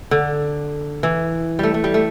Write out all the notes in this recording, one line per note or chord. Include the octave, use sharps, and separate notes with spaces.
D3
E3
G3 A3
A3
G3
A3